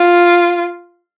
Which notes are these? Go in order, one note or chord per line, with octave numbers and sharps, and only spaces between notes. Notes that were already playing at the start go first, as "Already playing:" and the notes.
Already playing: F4